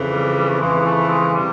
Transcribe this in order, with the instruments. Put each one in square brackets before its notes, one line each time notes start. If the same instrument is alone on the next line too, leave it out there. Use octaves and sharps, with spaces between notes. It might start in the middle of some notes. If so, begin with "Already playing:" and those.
Already playing: [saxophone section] F2 C#3 E3
[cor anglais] G3
G3
A3
[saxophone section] F2 C#3 E3 [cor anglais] G#3
[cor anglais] G#3
A3
G#3
[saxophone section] C3 [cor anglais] G3